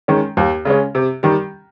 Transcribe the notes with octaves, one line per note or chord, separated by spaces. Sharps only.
D#3 G#3 C#4
D#2
C#3 G#3 C#4
C3
D#3 G3